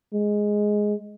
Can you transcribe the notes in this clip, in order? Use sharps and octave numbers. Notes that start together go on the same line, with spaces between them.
G#3